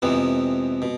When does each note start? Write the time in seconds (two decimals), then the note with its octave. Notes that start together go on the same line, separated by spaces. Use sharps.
0.02 F2 C3 E3 G#3 B3
0.82 B2